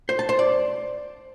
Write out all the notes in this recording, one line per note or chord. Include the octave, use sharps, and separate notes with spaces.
C5
A5
C5
D5